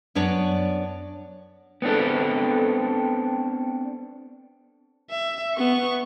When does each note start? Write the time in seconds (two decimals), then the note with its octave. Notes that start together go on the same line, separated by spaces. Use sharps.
0.15 F#2 B3 D4 C#5 D5
1.82 B3 C4 D4 A4
5.11 E5
5.56 B3 C#6